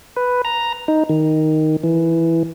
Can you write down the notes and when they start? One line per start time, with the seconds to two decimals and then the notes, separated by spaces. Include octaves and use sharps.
0.16 B4
0.45 A#5
0.88 D#4
1.09 D#3
1.84 E3